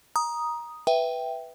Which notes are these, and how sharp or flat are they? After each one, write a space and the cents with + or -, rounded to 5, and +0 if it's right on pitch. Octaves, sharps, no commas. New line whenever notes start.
A#5 +20 D#6 +0
B4 +0 E5 +0 G5 +0